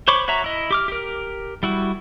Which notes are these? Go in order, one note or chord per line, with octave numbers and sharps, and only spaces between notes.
C5 C#5 B5 C#6 D6
F#4 C#5 E5 A#5
E4 D#5
G4 D6 F6
G4 A#4
G3 E4 F#4